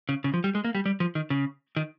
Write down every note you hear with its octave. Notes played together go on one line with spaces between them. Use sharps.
C#3
C#3
F3
G3
G#3
A#3
G3
G3
F3
D#3
C#3
D#3